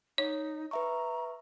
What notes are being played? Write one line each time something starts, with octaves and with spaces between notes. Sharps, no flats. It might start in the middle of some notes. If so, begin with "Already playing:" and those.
D#4 C#5
B4 E5 A#5 C#6